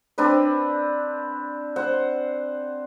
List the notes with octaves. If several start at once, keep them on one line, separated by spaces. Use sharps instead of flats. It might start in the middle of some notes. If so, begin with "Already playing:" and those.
C4 D4 B4
C5 F#5